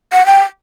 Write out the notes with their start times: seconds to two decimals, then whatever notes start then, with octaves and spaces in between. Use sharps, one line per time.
0.13 F#5
0.26 G5